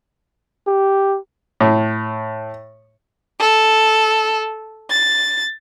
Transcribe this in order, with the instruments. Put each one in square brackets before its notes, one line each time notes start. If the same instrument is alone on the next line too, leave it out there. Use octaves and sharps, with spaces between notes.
[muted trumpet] G4
[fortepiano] A2
[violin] A4
A6